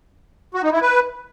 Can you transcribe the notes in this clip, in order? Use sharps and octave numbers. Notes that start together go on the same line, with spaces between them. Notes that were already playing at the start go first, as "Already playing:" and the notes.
F#4
D#4
E4
B4